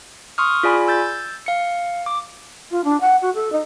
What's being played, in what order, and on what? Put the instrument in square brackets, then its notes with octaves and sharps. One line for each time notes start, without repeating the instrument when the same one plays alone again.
[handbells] C6 C#6 D#6 F6
F4 G#4 D5 G#5 B5
E6 G6 A6
F5 C#7
D6
[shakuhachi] F4
D4
F#5
F#4
A4
D#4